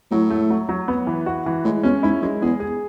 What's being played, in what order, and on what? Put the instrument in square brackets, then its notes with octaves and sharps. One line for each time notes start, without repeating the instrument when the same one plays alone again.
[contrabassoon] A2 [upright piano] F#3
[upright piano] A3
F#3
F#3
B3
E3
F#4
E3
[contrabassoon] A2 [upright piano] G#3
[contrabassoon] B2 [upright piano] C#4
[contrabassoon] G#2 [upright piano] E4
[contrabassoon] F#2 [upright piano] G#3
[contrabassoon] E2 [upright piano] G#4
[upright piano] G#4